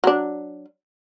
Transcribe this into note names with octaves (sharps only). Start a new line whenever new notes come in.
F#3 D4